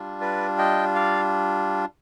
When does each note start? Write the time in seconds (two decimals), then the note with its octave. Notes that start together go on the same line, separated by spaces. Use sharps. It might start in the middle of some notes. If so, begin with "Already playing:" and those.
Already playing: G3 D4 F4
0.21 B4 D5
0.58 D#5 G5
0.95 D5 F5